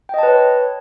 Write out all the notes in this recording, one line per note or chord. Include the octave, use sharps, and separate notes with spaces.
B4 C#5 D#5 G5 A5